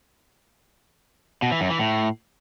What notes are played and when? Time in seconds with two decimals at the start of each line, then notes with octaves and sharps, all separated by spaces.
1.42 B2
1.52 E3
1.61 F#2
1.70 E3
1.79 A2